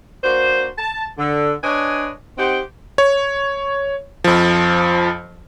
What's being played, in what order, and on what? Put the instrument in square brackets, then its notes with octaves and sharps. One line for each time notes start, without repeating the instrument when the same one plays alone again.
[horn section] A#3 D4 F#4 C5
A5
D3
D4 B4 C#5 D#5 G#5
C4 D#4 G4 C5 F#5 G5
[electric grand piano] C#5
F2 F3